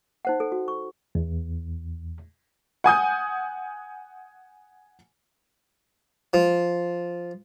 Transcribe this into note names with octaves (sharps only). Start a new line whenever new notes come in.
D#4 C5 F#5
A4
F#4
C#6
E2
F#5 G#5 D#6 G6
F3